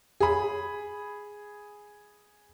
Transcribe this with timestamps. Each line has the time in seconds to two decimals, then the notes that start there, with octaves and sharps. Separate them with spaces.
0.20 G#4 B5